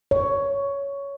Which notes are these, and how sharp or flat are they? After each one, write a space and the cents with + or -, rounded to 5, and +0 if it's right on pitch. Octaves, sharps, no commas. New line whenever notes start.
C#5 +10